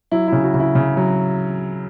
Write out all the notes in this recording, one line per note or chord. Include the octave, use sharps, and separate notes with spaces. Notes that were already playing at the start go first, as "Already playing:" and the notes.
F#3 E4
C#3 E4
F#4
C#3
E4
C#3
F#3